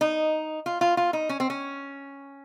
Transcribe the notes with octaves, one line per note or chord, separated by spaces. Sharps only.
D#4
F4
F4
F4
D#4
C#4
C4
C#4